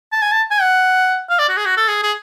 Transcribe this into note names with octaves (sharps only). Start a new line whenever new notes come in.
A5
G#5
A5
G#5
F#5
F5
D5
F#4
G#4
F#4
A4
G#4
G#4